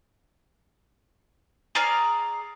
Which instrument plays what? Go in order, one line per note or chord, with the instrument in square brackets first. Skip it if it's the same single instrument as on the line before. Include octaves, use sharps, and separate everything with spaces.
[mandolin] G#4 D5 A#5 F6